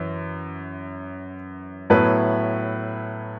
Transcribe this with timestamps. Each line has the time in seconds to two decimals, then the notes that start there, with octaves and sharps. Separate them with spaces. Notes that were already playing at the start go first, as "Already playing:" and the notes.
Already playing: F#2 E3
1.90 A2 F#3 B3 E4 B4